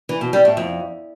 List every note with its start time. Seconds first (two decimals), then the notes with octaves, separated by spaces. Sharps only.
0.09 E3
0.21 B2
0.33 G3
0.45 A2
0.57 F2